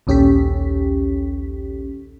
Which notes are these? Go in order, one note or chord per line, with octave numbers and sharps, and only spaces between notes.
A#1 D#2 C#4 G4 A4 B6